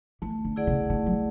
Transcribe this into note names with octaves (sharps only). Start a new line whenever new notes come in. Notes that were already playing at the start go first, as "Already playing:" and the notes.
E3 A3
D3
E4 G#4 D5 F#5
C#3
D3 A3
F#3